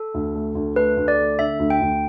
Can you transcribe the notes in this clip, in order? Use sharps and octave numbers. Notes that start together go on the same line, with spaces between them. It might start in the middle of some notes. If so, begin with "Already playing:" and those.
Already playing: A4
D2
A3
D2
A3 B4
D2
D5
A3
D3 E5
D2
G5
D2